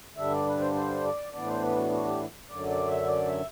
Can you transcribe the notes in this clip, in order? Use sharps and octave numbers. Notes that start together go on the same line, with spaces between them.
G2 D3 G3 D4 E5
D5
B4
C5
C5
D5
A2 E3 B3 D4 D5
C5
B4
F#4
F#4
G4
F#2 D3 F#3 D5
D5
E5
D5
E5